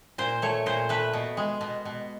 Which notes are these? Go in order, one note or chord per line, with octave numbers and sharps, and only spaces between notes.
A#2 C5
A3 C#5
A#2 C5
A3 B4
B2
G#3
B2
B2